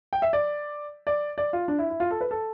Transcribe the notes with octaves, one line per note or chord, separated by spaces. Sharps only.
G5
E5
D5
D5
D5
F4
D4
E4
E4
F4
A4
B4
A4